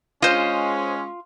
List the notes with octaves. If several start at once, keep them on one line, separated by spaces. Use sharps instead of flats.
G#3 C#4 F4 C5 D#5